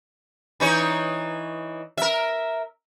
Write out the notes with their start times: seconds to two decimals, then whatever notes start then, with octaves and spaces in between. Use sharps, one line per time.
0.60 E3 D#4 C#5
1.97 A#4 E5